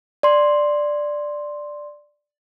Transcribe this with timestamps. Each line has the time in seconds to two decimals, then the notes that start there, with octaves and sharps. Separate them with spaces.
0.23 D5 C6